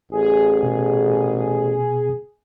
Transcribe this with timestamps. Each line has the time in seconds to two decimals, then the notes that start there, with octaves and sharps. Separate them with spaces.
0.12 A1 G#4
0.63 B2